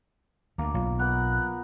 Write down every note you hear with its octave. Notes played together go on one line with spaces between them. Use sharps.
D2 A#3
B1 F4
B3 A#4 F#6